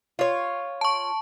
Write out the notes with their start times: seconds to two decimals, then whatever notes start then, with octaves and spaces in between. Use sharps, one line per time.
0.19 F4 C#5
0.81 A5 C#6